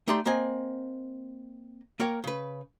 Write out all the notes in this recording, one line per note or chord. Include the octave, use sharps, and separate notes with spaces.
A3 D#4 G4 D5 C6
A#3 C4 D#5 G#5
A#3 A#4 C#5 G5
C#3 B4